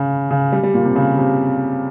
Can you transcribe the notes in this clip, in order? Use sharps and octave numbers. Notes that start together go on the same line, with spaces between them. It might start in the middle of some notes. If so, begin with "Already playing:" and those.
Already playing: C#3
C#3
G3
G3
A#2
C3
C#3
C3